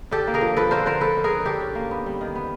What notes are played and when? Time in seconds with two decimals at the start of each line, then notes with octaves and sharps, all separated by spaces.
0.11 D3 G4 A4
0.27 A#3
0.34 G#4 A#4
0.41 F3
0.57 F3 A4 B4
0.71 D3 A#4 C5
0.86 D3 A#4 C5
1.01 D3 A4 B4
1.17 D3
1.24 G#4 A#4
1.31 D3
1.45 D3 G4 A4
1.61 C#4
1.75 A#3
1.91 B3
2.06 G3
2.21 D#3
2.35 B3